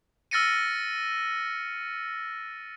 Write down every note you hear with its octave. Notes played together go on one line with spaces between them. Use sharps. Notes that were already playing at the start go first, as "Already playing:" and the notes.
E6 F6 A6 A#6 C#7 D#7